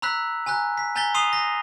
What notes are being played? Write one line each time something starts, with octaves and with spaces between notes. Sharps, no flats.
A#5 B5 E6 F#6 B6
G#5 A#5 B5 F#6
B6
G#5 A#5 G6 A6 B6 G7
C6 D#6 C7 D#7 F7 G7
A#6